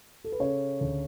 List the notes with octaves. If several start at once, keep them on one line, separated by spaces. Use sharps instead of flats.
A4
B4
C#3 A4 C#5
D2